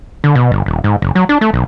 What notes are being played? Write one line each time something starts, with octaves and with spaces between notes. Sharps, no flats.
D3
B2
G1
D#1
G#2
F#1
F#3
D4
A3
B1